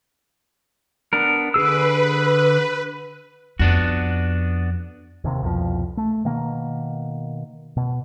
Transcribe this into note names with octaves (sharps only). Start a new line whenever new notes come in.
B3 D4 A#4
D3 G#4 B4 E6
F2 B3 D4 F#4
D#2 C3
C2 F2 B2 F3
A3
B2 D#3 A#3
B2